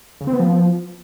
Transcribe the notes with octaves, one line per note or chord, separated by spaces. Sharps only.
C#3
C4
B3
F3